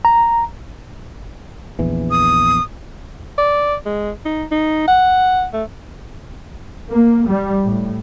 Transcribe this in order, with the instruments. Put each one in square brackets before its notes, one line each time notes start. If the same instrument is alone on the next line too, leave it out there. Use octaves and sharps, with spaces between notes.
[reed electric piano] A#5
[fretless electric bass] A#1 E2 E3
[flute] D#6
[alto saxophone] D5
G#3
D#4
D#4
F#5
A3
[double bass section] A#3
G3
A2